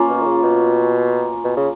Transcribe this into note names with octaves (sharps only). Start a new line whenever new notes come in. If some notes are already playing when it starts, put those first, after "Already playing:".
Already playing: A#3 C#4 F4
B2
D#3
C#3
B2
B2
C#3